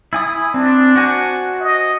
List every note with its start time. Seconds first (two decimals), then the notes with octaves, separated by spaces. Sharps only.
0.13 E4 G#5 D#6
0.54 C4 D4
0.96 F#4 C5 G#5
1.60 D#5